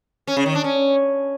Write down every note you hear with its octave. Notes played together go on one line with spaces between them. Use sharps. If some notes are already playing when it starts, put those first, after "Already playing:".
C#4
C#3
D#3
D4
C#4